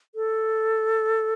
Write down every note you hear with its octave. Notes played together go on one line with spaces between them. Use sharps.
A4